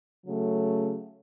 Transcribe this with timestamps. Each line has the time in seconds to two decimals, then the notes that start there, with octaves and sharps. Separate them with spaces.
0.24 C#3 F#3 A3